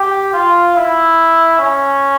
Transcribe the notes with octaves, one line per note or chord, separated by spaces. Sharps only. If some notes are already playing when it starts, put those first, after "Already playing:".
Already playing: G4
F4
E4
C#4